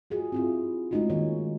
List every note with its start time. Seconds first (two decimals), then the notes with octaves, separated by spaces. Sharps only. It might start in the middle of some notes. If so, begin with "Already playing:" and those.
0.10 F4 F#4 G#4
0.32 C4 E4 F4
0.91 G#3 A3 C#4 D#4 F4 F#4
1.10 D#3 A#3 C#5